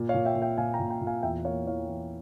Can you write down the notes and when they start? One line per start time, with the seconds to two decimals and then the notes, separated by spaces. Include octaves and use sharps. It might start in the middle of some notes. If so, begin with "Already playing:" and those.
Already playing: A#2
0.09 C#5 F5
0.14 A#2
0.25 E5 G5
0.36 A#2
0.42 E5 G5
0.58 A#2 F5 G#5
0.74 G5 A#5
0.80 A#2
0.90 G5 A#5
1.01 A#2
1.07 F5 G#5
1.23 E2 E5 G5
1.44 A#3 C#5 F5
1.67 E3 C#5 F5
1.88 E3